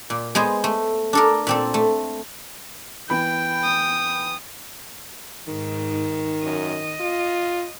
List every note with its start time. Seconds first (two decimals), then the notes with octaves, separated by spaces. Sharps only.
0.10 A#2
0.35 G#3 B3 G#4 C5
0.64 A3
1.13 D4 A4 A#4
1.47 A#2 C4 A4
1.74 A3
3.10 E3 B3 G5 B5
3.64 D#6
5.48 G#2 D#3
6.43 F#2 D#5
7.00 F4